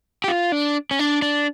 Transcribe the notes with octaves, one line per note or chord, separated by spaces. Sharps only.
G4
F4
D4
C#4
D4
D4